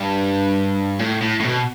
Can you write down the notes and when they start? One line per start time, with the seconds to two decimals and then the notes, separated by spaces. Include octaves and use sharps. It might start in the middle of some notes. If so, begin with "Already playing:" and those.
Already playing: G2
0.99 A2
1.22 A2
1.40 A2
1.45 B2